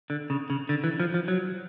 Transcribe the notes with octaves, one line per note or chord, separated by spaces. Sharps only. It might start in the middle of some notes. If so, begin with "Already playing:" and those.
D3
C#3
C#3
D3
E3
F3
F3
F#3